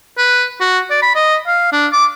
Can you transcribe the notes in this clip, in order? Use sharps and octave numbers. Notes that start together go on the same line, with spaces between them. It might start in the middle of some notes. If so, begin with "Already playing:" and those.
B4
F#4
D5
B5
D#5
F5
D4
D6